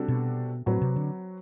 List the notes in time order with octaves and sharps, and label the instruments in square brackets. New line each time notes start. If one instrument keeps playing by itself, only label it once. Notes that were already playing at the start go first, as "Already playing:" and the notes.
Already playing: [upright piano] C3 G3 D4 F#4 A4
[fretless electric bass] B2
[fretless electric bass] A2 [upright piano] F#3 C4 F#4 B4
[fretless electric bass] C3
D3